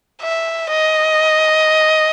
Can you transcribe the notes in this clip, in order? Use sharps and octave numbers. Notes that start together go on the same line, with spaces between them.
E5
D#5